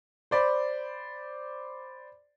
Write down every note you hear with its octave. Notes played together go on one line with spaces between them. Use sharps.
C5 D5 B5